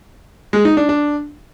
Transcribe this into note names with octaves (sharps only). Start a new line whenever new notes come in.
G#3
D#4
D4
D4